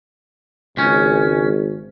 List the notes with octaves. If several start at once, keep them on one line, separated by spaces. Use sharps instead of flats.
G#1 C#2 C#4